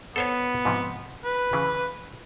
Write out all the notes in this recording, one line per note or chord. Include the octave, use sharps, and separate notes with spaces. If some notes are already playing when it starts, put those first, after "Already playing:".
B3 A4 C5 C#5
G#2 C3 F3
B4
C#3 E3